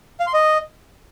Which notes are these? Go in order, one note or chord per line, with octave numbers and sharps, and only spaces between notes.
F5
C6
D#5